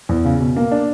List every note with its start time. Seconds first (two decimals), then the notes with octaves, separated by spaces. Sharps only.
0.09 E2
0.25 C#3
0.40 B2
0.56 A#3
0.71 D4